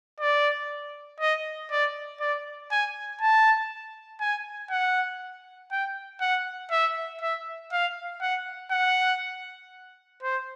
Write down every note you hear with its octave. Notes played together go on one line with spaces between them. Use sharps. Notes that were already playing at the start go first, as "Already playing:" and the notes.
D5
D#5
D5
D5
G#5
A5
G#5
F#5
G5
F#5
E5
E5
F5
F#5
F#5
C5